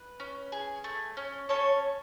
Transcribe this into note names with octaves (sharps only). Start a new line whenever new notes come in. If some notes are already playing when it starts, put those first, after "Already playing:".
Already playing: B4
C#4
G#4
A3
C#4
C#4 A4 C#5